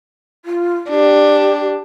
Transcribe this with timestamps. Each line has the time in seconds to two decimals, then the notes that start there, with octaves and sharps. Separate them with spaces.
0.45 F4
0.90 D4 G4